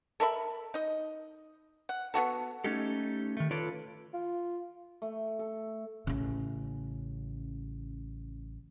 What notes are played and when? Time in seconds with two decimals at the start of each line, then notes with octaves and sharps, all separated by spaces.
0.20 A4 A#4 E5 B5
0.74 D#4 D#5
1.89 F#5
2.14 B3 F4 F#4 A4
2.64 A3 C#4 D#4 G4 A4
3.37 D#3 A3
3.51 F4 A4 B4 C#5 D5
4.14 F4
5.02 A3
5.39 A4
6.07 A1 C#3